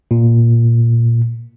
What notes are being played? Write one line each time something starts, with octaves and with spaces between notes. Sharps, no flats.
A#2